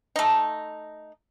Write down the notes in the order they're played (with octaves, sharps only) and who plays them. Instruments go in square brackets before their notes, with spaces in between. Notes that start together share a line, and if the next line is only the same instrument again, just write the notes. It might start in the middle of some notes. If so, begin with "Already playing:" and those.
[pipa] A3 D#4